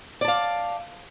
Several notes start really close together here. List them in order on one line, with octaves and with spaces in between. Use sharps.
D5 A5 F5